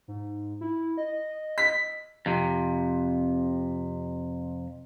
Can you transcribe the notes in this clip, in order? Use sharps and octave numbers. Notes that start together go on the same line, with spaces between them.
G#2
E4
D#5
B6
F2 C3